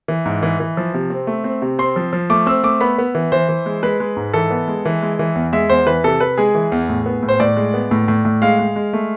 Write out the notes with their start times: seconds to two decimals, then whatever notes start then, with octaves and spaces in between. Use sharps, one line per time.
0.08 E3
0.25 G#2
0.43 E3
0.60 E3
0.77 F3
0.94 C3
1.10 C4
1.27 A3
1.44 C4
1.62 C3
1.79 C4 C6
1.96 F3
2.13 F3
2.30 A3 D6
2.47 C4 E6
2.63 A3 D6
2.81 B3 B5
2.98 B3
3.15 E3
3.32 E3 C5
3.49 E3
3.66 G#3
3.83 G#3 B4
4.00 G#3
4.17 G#2
4.33 E3 A4
4.50 B3
4.68 G#3
4.85 E3
5.02 G#3
5.19 E3
5.35 E2
5.53 G#3 E5
5.70 E2 C5
5.87 E3 B4
6.04 C3 A4
6.20 C3 B4
6.38 G#3 G#4
6.55 E3
6.72 E2
6.89 A2
7.06 B3
7.23 A2
7.29 C5
7.40 A2 D5
7.56 G#3
7.74 B3
7.91 A2
8.08 A2
8.25 A2
8.42 G#3 F5
8.59 G#3
8.76 G#3
8.93 A3